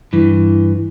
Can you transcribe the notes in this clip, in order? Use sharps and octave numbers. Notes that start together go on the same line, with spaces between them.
G2 E3